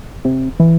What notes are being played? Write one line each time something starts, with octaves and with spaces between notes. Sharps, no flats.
C3
E3